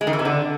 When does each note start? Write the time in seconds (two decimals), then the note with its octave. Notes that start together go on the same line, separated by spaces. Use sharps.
0.01 G#3
0.07 D#3
0.13 E3
0.19 C3
0.25 D3